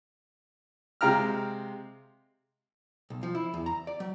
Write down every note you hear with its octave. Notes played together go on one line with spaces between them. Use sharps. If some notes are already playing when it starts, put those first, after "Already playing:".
C3 G#3 F5 G5 A#5 F6
B1
F3
E4
E2
A#5
D5
F#3